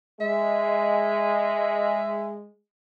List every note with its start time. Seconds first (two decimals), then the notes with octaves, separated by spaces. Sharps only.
0.20 G#3 E5